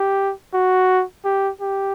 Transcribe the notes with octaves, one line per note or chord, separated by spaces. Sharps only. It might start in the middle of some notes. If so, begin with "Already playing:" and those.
Already playing: G4
F#4
G4
G4